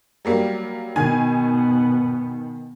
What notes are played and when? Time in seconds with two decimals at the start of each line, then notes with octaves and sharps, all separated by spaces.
0.25 F#3 G3 A#3
0.96 B2 D#3 B3 G#5 G#6